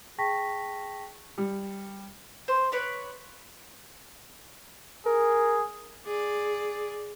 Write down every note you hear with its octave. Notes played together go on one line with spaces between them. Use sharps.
G#4 G5 A5 C#6 A#6 B6
G3
C5
B4 C#5 D5
G#4 A#4
G#4 D5